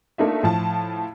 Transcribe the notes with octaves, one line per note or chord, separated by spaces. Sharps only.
A3 A#3 D4 D#4 F4 E5
A2 F3 A5